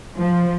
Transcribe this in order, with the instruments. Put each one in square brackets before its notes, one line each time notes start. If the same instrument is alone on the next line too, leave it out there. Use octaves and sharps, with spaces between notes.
[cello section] F3